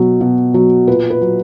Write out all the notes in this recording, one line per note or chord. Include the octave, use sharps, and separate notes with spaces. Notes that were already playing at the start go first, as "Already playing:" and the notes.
Already playing: B2 F#3
B2
F#3
A#2 B4
B4
F#3